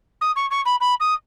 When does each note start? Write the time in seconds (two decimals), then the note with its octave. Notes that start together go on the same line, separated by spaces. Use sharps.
0.21 D#6
0.36 C#6
0.50 C#6
0.65 B5
0.80 B5
1.00 D#6